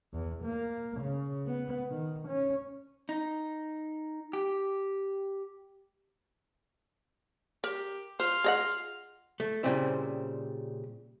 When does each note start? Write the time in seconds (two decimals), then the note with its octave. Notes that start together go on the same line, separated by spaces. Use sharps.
0.13 E2
0.43 A#3
1.00 C#3
1.46 B3
1.90 D#3
2.27 C#4
3.09 D#4
4.33 G4
7.64 G4 A#4
8.20 F4 C5
8.44 G#4 D#5 F#5
9.40 A3
9.63 A#2 C#3 G3 C4 E4